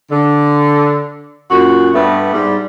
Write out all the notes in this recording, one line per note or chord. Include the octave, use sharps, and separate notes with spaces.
D3
F#2 A#2 F#4
G2 A3 B3
G#2 G3